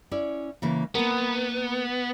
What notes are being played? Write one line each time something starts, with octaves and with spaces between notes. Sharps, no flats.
C#4 E4 D5
C#3 E3 A#3
A#3 B3 A#4